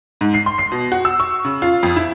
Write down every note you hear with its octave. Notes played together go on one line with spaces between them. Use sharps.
G#2
C7
C6
C7
B2
F#4
E6
C#6
C#3
F4
F2
E4